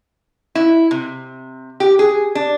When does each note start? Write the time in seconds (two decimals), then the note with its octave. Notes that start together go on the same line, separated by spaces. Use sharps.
0.55 E4
0.91 C3
1.80 G4
1.99 G#4
2.35 D4